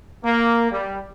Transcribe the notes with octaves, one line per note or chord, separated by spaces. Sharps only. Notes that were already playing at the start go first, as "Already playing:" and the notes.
A#3
G3